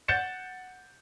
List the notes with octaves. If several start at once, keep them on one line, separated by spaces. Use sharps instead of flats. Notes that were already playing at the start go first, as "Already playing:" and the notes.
F#5 G6 A6 C#7 E7